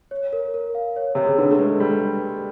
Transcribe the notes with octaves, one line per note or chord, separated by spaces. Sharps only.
C#5
A#4
A#4
F5
C#5
C3 C#5
C#3
D3 B4
A3
G#3 B4
G3 B4